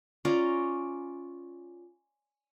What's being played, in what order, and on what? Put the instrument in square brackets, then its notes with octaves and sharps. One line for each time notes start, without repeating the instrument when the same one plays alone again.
[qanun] C#4 F4 D5 A#5